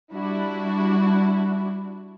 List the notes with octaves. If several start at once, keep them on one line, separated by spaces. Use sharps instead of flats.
G3 D4 E4 F#4